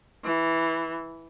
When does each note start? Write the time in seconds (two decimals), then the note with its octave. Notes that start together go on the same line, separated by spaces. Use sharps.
0.24 E3